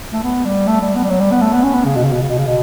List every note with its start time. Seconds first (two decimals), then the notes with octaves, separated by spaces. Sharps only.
0.13 A3
0.23 B3
0.45 G3
0.67 A3
0.81 G3
0.96 B3
1.04 G3
1.09 F#3
1.20 G3
1.31 B3
1.42 A3
1.53 B3
1.63 C#4
1.74 B3
1.85 C#3
1.95 B2
2.03 C#3
2.12 B2
2.21 C#3
2.30 B2
2.38 C#3
2.47 B2